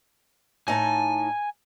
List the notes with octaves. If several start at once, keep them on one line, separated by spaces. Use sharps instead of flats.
A2 D#4 G#5 A5